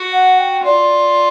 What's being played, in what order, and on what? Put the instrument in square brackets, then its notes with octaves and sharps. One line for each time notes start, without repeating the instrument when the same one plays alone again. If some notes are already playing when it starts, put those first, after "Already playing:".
Already playing: [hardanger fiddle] F#4
[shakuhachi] F#5
G5
[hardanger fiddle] F4 [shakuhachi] D5